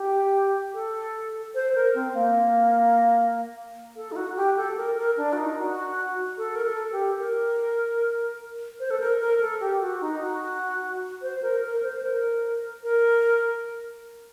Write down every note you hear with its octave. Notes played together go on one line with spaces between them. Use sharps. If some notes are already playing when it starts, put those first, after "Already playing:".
Already playing: G4
A4
C5
A#4
C4
A#3
A4
D#4
F#4
G4
A4
A#4
A#4
D4
F#4
D#4
F#4
A4
A#4
A4
G4
A#4
C5
A4
A#4
A#4
A4
G4
F#4
D#4
F#4
C5
A#4
A#4
C5
A#4
A#4